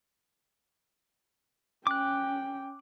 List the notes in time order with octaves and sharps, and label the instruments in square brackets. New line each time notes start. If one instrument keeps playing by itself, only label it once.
[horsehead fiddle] C#4 G5 [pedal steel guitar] D6 F#6